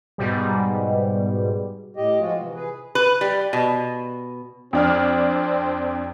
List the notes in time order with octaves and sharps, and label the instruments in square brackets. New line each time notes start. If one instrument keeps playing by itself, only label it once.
[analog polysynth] G#2 B2 G3
[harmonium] A2 G4 D#5
F3 G#3 F4 F#4
C3 E3
G#4 B4
[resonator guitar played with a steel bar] B4
G3
B2
[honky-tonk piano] F2 D4 F6 [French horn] C4